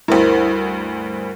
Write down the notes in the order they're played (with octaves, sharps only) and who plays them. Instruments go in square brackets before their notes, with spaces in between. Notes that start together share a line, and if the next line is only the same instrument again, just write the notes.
[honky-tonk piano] D2 G2 [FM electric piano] E4 A#4 C5